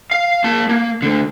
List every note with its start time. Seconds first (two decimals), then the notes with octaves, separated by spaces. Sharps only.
0.11 F5
0.44 A#3 A5
0.69 A#3
1.02 D2 D3